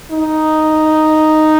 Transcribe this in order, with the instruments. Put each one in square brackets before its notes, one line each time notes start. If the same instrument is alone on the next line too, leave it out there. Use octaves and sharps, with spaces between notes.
[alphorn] D#4